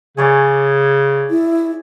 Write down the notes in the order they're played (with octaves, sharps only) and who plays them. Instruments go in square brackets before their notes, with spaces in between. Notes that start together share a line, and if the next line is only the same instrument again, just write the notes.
[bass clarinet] C#3 [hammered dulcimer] G#4 C#5 D5
[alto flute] E4